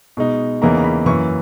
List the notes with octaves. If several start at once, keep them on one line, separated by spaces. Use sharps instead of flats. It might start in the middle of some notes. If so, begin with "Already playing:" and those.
B2 G#3 D#4
E2 C#3 E3 A#3 D#4 A#5
A#5
B5
F#2 E3 A#3 C#6